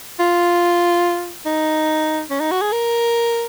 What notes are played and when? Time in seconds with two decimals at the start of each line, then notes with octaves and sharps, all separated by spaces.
0.20 F4
1.46 D#4
2.30 C#4
2.40 D#4
2.51 F#4
2.62 G#4
2.72 A#4